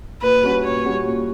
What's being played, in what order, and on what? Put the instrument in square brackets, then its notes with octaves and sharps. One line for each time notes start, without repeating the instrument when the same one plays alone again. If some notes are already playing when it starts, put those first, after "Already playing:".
[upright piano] A#2 [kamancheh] B4
[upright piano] G3 C#4 F#4
[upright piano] A#2 [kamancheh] C#5
[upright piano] G3 C#4 F#4
A#2